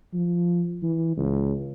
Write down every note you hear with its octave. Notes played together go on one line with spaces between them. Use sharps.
F3
E3
C#2